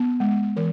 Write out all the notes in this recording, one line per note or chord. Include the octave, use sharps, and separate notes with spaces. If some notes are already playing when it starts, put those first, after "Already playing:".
Already playing: B3
G#3
E3 A#4